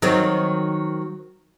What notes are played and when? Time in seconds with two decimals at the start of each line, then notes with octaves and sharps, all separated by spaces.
0.02 D#3 F#3 C4